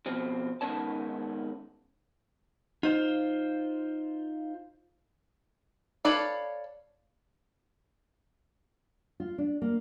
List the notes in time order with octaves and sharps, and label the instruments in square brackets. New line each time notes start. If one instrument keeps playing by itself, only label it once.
[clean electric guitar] B2 F3 C4
G#2 D#3 B3 C#4 C#5 A5
[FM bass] D#4 [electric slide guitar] F4 C5
[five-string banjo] A4 B4 C#5 D5 F5
[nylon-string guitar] F4
D4
A#3